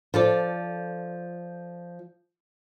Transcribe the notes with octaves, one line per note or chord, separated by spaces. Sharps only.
F3 A4 D5